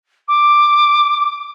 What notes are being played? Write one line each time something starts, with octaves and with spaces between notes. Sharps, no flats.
D6